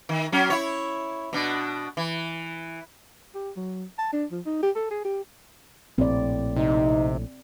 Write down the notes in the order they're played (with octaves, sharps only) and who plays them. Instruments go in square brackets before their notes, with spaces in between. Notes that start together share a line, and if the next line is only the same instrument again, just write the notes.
[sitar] D#3
F#3 C#4
E4 C#5
B2 D4
E3
[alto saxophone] G4
F#3
A5
D4
F3
D#4
G4
A4
G#4
G4
[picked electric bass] A#1 A2 [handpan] C4 D5
[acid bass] C3 [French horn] D#4